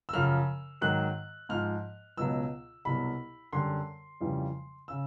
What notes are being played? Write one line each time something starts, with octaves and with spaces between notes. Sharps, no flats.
E6
F#2 C#3 F3 F6
G#2 D#3 F#3 F#6
G#2 F3 F6
C#2 B2 F#3 E6
C2 B2 F#3 B5
F#2 D3 G3 C6
F2 C#3 E3 G3
C#3 E6